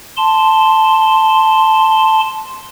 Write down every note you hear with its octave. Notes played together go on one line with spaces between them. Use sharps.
A5 C6